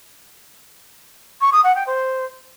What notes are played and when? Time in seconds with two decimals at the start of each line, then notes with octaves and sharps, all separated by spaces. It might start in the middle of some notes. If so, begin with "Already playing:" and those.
1.41 C#6
1.52 D#6
1.64 F#5
1.75 G5
1.87 C5